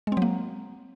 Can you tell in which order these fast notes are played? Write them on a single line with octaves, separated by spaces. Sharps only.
G#3 C4 F#3 A#3